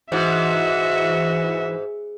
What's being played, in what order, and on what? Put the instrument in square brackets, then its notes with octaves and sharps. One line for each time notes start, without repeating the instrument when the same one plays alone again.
[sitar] G#2 [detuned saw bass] E3 [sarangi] F#4 [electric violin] E5